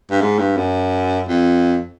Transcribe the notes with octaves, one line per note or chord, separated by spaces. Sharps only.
G2
G#2
G2
F#2
F2